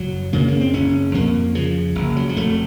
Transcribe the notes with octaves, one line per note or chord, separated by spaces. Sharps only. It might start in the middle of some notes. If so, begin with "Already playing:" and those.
Already playing: F#1 F#3
C#3 A#3
A#3
C4
F#1 C#4
F2 A#3
C#3 F3
F#1
F#3
F#3
F1 A3